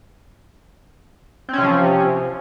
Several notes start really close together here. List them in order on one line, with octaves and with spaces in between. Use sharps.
C4 C#4 C3 F3